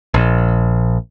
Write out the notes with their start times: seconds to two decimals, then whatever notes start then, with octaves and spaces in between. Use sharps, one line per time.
0.14 A#1